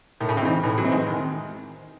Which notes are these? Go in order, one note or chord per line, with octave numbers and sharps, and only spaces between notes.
A2 D#3
C#3
C3
C#3 E3 C4 D#4
A2 E3
F#3
E3 C4 D#4
G#3
D#3